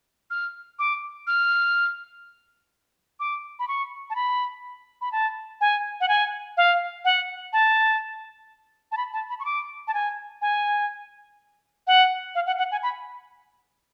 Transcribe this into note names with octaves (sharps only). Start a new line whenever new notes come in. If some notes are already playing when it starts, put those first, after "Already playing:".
F6
D6
F6
D6
B5
C#6
A5
B5
B5
A5
G#5
F#5
G#5
F5
F#5
A5
A5
B5
A5
B5
C#6
D6
A5
G#5
G#5
F#5
F5
F#5
F#5
G#5
B5